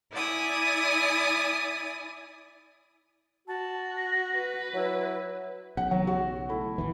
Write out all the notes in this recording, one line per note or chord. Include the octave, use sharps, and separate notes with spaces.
E4 D5 G#5 D#6
F#4 A5
A#6
B4
F#3 E4
B1 C#3 F#5
F#3
F#4
A3 E4
A1 D#2 E3